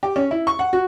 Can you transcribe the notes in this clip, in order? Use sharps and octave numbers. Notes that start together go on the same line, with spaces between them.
G4
C#4
E4
C#6
F#5
F#4